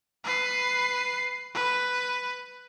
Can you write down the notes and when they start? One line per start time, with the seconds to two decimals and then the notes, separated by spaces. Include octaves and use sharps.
0.24 B4 C7
1.54 B4